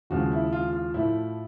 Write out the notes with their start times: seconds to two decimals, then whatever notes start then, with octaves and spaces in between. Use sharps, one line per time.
0.10 D#2 C#3 F3 G#3 F#4
0.32 E4
0.53 F4
0.73 F4
0.94 A2 F3 A3 E4